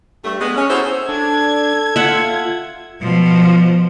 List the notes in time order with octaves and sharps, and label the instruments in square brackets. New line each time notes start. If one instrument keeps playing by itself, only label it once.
[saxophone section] G2 A3
G#3 B3
C#4
E4 F#4 G#4 A4 C5 C#5
[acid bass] D4 [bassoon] A4 [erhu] G#6
[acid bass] F4 [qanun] E5 F#5
[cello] B2 F3